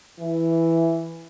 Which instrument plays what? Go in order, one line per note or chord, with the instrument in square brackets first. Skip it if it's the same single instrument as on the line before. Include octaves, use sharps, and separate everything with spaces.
[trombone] E3